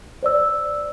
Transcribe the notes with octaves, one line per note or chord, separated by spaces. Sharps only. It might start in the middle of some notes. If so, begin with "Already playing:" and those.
C5 D5 E6